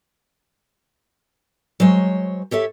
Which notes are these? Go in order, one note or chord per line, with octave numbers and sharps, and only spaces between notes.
F#3 G#3 C5 C#5
G4 A4 C#5 E5